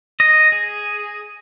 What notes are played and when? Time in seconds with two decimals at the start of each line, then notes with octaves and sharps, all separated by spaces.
0.20 D#5
0.52 G#4